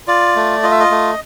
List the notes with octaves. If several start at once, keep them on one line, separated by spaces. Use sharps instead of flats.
F4 D5
A3
F4 D#5
E5
D#5
A3